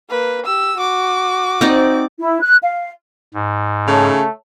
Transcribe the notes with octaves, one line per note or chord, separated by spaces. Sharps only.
A#3 B4
G4 E6
F#4 D6
C4 D#4 D5
E4
F#6
F5
G#2
C#3 A3 C#5 A5 F7